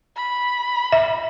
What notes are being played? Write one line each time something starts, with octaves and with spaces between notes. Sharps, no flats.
B5
E5